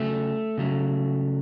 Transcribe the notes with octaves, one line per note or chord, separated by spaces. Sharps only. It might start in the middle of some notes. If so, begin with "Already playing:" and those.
Already playing: C#3 F#3 A3
C#3 F#3 A3